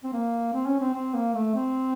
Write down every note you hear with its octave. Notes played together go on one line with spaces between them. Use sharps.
C4
A#3
C4
C#4
C4
C4
A#3
A3
C4